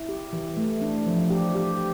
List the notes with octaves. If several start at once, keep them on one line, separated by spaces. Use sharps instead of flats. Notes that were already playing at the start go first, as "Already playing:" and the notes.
Already playing: E4
G4
E3
A3
D4
F3
G4
G4